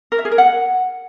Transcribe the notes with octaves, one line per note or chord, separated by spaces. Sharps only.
A#4
E5
G#4
A#4
F#5